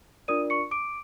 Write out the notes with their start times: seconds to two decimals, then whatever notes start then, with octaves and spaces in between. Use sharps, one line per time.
0.28 D4 F4 A#4 D5 D#6 D#7
0.50 C#6 C#7
0.71 D6 D7